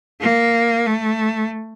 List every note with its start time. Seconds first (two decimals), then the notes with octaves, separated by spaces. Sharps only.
0.21 A#3
0.86 A3